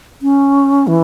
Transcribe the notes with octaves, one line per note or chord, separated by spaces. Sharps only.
C#4
E3